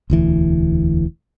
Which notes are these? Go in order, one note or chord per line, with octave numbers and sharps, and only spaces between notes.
E1 D2 E3